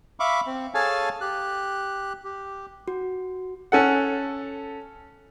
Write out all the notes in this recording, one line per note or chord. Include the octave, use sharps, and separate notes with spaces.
E5 F5 B5 C#6 D6
C4
G#4 A4 C#5 F5 G#5 A5
G4 F#6
G4
F#4
C#4 A4 F#5